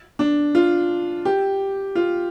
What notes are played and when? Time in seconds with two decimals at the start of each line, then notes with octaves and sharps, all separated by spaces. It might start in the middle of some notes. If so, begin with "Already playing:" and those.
0.19 D4
0.55 F4
1.25 G4
1.95 F4